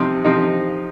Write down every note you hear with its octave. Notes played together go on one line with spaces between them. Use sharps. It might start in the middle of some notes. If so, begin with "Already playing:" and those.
Already playing: C3 F3 C4 D#4
C3 F3 C4 D#4